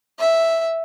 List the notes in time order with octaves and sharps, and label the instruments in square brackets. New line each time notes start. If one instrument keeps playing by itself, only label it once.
[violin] E5